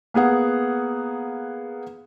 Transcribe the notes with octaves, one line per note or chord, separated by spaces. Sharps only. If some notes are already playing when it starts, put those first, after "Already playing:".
A#3 B3 G#4 F#5